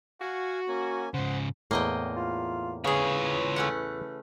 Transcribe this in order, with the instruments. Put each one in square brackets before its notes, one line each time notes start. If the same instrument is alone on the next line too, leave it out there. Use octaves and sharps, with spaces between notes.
[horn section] F#4 [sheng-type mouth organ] F5 F#5 G#5
[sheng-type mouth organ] A#3 C#4 G#5
[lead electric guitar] G#2 C#3 [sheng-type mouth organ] C5 F#5 C6
[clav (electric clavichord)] E2 A2 [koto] A#3 D#5 G5
[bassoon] F4
[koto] C#3 G#4 [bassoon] E3 [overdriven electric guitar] F4 C#5
[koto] A3 C#4 F#5